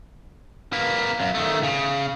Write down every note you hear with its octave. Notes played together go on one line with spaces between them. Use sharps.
A#3 B4
F#2
D#3 A3
C#3